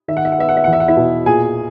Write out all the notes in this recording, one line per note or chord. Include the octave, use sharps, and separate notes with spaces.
D#3 E5
F#5
E5
F#5
B3 E5
F#5
E5
F#5
E2
E5
F#5
E4 E5
B2
A#2 G#4 G#5